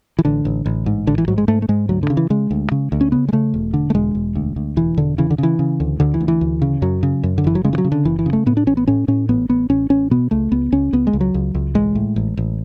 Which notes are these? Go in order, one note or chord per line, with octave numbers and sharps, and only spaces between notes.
E3
A1 D3
A1
A1
G#2
A1 D3
E3
G#2 F#3
G#3
G#2 A3
A3
G#2 G#3
D2 F#3
D3
C#3
E3
C#3 G#3
D2
C#3
D2
C#4
C#3 B3
G#3
C#3 A3
E1
D3
A3
E1 G#3
E1
D2
D2
E1 E3
E1 D3
C#3 E3
D3
C#3 E3
C#3
D2
D2 D3
E3
D2
E3
D2
C#3
F#2 F#3
C#3
F#2
D3
F#1 E3
F#3
C#3 G#3
E3
F#3
C#3
D3
F#1 E3
E3
C#3
A3
A2 B3
D4
A1 C#4
B3
A2 C#4
A2 C#4
A1 B3
A1 B3
A1 C#4
A1 C#4
B2 B3
C#2 A3
C#2 B3
C#2 C#4
C#2 B3
G#3
C#2
F#3
C#2
C#2
A1 G#3
A2
A1
A1